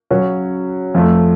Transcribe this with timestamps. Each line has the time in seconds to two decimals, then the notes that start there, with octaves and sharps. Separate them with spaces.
0.11 C#3 F#3 C#4
0.95 F2 F3 A3